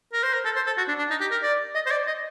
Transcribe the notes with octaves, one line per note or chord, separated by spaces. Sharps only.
A#4
C5
A#4
A4
C5
A4
F#4
D4
D4
D#4
G4
A#4
D5
D#5
C5
D5
D#5